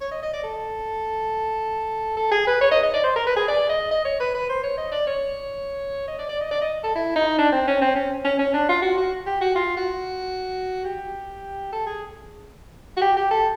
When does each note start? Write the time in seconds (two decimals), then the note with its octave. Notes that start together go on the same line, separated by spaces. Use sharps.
0.01 C#5
0.11 D#5
0.22 D#5
0.34 D5
0.43 A4
2.17 A4
2.31 G#4
2.47 B4
2.61 C#5
2.71 D#5
2.83 D#5
2.94 D5
3.04 C5
3.16 A#4
3.27 B4
3.36 G#4
3.48 D5
3.69 D#5
3.91 D#5
4.05 C#5
4.20 B4
4.34 B4
4.49 C5
4.63 C#5
4.78 D#5
4.92 D5
5.07 C#5
6.08 D#5
6.19 D5
6.29 D5
6.41 D#5
6.51 D5
6.62 D#5
6.83 A4
6.95 E4
7.16 D#4
7.38 D4
7.52 C4
7.67 C#4
7.81 C4
7.95 C#4
8.25 C#4
8.39 C#4
8.54 D4
8.69 F4
8.82 F#4
8.97 F#4
9.26 G4
9.41 F#4
9.55 F4
9.77 F#4
10.85 G4
11.72 A4
11.86 G#4
12.97 F#4
13.01 G4
13.17 G4
13.31 A4